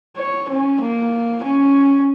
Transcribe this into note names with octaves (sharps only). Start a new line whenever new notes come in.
C#5
C#4
A#3
C#4